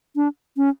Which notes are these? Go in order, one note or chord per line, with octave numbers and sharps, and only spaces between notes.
D4
C#4